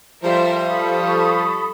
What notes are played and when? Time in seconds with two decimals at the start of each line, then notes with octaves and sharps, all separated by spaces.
0.23 F3 G3 A4 A#4 C5 E5
0.67 A4 B5 C#6 D#6